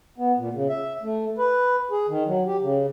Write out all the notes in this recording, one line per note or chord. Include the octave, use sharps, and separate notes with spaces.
B3
A#2
C#3
E5
A3
B4
G#4
D#3
F#3
G4
C#3